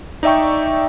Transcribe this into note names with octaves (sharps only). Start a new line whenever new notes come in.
D#4 D5 E5 G5 C#6